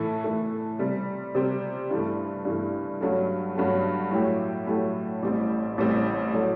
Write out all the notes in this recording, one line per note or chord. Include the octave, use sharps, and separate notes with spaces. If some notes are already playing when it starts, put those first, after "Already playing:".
Already playing: A2 E3 A3 E4 A4
A2 E3 A3 E4 A4
C3 G3 C4
C3 G3 C4
G2 E3 A3
G2 E3 A3
G2 F#3 A3
G2 F#3 A3
A2 F#3 A3 E4 G4
A2 F#3 A3 E4 G4
A1 A2 G3 C4
A1 A2 G3 C4
A2 F#3 A3